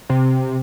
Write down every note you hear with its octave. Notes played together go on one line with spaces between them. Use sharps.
C3